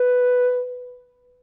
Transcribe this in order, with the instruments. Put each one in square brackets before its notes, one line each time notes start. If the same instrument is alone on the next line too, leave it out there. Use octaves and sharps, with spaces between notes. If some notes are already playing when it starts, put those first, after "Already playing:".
Already playing: [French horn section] B4